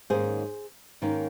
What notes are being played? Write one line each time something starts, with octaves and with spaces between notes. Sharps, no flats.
G#2 D#3 A#3 C#4 G#4 C5
G#2 D#3 A#3 C#4